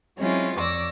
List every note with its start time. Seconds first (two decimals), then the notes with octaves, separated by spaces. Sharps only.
0.17 F#3 G#3 C4 C#4 E4 F4
0.58 F2 C#5 D5 D6 E6 A#6